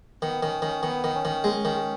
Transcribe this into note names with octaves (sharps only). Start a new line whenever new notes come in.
D#3 B3
D#3 C#4
D#3 C#4
D#3 B3
D#3
C#4
D#3
G#3
D#3